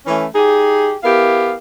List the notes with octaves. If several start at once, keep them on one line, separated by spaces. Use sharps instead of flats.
E3 A3 C#4
D#4 G4 G#4
B3 E4 G4 A#4 F5